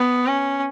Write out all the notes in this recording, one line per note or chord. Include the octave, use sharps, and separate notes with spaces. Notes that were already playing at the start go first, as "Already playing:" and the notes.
Already playing: B3
C#4